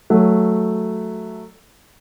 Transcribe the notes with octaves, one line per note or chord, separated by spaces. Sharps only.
F#3 A3